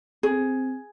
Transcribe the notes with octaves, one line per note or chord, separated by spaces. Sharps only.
C4 G#4